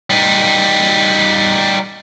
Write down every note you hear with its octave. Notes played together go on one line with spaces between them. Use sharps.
G3 D#4